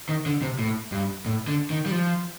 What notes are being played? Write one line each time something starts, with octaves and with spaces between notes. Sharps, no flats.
D#3
D3
C3
A2
G2
A2
D3
D#3
G3
F3